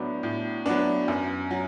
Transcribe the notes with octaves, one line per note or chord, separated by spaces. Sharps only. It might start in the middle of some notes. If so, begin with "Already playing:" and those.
Already playing: A2 F#3 B3 D4
A2
F#3 B3 D4
F#2
F#3